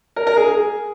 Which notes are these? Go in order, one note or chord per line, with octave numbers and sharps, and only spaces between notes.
A#4
A#4
G#4
G#4